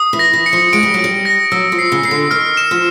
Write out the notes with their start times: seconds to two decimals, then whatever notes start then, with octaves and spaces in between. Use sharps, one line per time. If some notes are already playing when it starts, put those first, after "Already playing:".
Already playing: D#6
0.13 E3
0.19 A#6
0.33 E3
0.46 C#7
0.53 F3
0.73 G#3 D7
0.83 G3
0.94 F#3
0.99 G3 D7
1.25 A#6
1.52 F#3 E6
1.72 F3
1.79 C7
1.92 C#3
2.03 C#3 C7
2.11 D3
2.31 D#3 F6
2.57 E7
2.71 F3